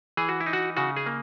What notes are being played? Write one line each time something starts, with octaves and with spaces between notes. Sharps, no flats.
E3 G#4
F#4
E4
D#4
F#4
C#3 F#4
G#4
A#3